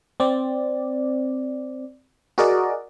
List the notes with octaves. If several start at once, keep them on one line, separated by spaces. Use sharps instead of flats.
C4 D5
F#4 G#4 A#4 D5 D#5